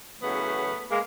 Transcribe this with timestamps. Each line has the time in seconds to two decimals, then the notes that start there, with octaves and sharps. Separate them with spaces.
0.21 E2 C#3 F#3 A3 B3
0.91 G#3 A#3